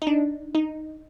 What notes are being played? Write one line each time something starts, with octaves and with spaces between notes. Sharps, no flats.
D#4
D4
D#4